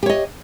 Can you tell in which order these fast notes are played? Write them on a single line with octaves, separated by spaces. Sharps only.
G4 C#5 D#5